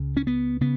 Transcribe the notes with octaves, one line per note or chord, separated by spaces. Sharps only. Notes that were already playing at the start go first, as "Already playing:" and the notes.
Already playing: C#2 C#3
C#4
B3
C#3 B3